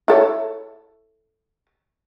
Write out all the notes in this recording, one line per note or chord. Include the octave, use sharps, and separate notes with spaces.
E4 A4 C#5